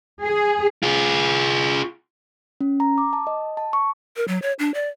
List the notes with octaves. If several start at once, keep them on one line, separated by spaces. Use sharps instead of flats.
G#4
F4 G#4
C#4
A#5
D6
A5
D#5
A5
C#6
A#4
F#3
C#5
D4
D5